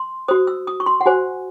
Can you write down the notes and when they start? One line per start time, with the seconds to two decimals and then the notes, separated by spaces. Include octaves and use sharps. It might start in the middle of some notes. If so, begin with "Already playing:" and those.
Already playing: C6
0.28 F#4 C5 D#6
0.47 E6
0.67 D#6
0.80 C#6
0.86 C6
1.01 F#5
1.06 F#4 C5 G#5